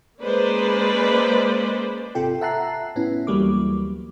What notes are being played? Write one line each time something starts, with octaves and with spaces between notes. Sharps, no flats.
G#3 A#3 C#4 B4 C5 D5
G#1 C3 F4 A4 G5
E5 F#5 A5 A#5 F#6 C7
A2 B3 C#4 E4
D2 E3 F#3 G3 A#3 D6